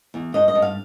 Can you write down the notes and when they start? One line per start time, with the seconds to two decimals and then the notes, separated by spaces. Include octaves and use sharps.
0.14 E2
0.34 G2 D#5
0.48 D#5
0.55 G2
0.62 F5